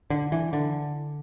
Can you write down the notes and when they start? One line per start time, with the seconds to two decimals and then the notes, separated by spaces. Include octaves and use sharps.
0.10 D3
0.32 E3
0.53 D3